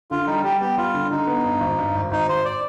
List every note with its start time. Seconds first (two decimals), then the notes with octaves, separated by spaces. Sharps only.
0.11 D3 F4
0.27 G3 D#4
0.44 G3 G4
0.61 B3 G4
0.77 G3 F4
0.94 D3
1.11 D3 D#4
1.27 B3
1.44 G2
1.61 G#1
1.79 G2
1.95 G#1
2.11 G#1 D#4
2.29 G#1 C5
2.45 D5